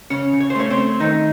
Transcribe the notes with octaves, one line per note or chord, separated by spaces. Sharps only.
C#3 C#4 C#5
C#3
C#5
C5
A3 C#4 C#5
C4 C5
A3
D#3 A3 D#4